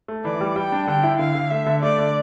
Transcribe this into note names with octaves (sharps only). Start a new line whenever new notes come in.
A3
E3 D5
G3
G3 G5
D4
D3 G5
E4
D3 F5
D3
A3 E5
D3
A3 D5
D3